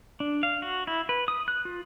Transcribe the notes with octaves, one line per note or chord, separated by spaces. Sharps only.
D4
F5
F#4
E4
B4
D#6
F#6
F4